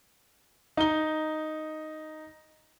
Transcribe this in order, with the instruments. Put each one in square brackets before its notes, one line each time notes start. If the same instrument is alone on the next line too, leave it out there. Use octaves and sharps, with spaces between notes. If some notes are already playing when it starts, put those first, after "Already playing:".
[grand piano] D#4 G7